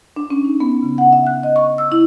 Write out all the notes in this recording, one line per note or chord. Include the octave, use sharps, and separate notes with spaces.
D4
C#4
D#4
B3
C#3
F#5
E5
F#6
D#5
C#6
E6
E4